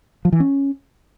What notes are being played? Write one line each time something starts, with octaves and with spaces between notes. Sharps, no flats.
F3
E3
C#4